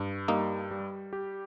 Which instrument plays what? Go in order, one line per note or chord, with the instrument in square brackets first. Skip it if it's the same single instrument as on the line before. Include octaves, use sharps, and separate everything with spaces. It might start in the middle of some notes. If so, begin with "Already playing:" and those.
Already playing: [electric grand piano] G2
[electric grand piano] G3 [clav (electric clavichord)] A#3 D#4
[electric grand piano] G3
G4